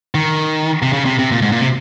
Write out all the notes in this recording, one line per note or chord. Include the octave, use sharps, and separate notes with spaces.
D#3
C3
C#3
C3
C3
A#2
G#2
A#2
C3